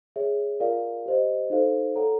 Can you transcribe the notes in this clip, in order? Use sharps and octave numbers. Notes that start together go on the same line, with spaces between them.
G#4 C#5 E5
F4 A#4 D5 F5
G4 C5 D#5
D#4 F#4 A4 C5 F5
A4 C#5 F#5 A#5